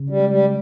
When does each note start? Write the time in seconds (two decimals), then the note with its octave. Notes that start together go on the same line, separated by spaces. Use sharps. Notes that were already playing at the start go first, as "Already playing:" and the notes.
Already playing: C#3
0.10 G3
0.20 G#3
0.29 G3